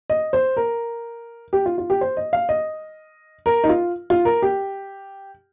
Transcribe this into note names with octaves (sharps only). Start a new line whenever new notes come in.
D#5
C5
A#4
G4
F4
F4
G4
C5
D#5
F5
D#5
A#4
D#4
F4
F4
A#4
G4